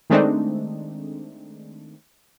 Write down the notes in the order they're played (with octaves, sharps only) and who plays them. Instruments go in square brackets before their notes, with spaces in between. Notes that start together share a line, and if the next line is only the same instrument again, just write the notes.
[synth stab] D#3 G#3 A3 C4 D4 D#4